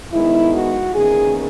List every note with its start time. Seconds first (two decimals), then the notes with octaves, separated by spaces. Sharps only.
0.11 G#2 D#3 G#3 B3 E4
0.53 F#4
0.95 E2 D#3 A#3 C#4 G#4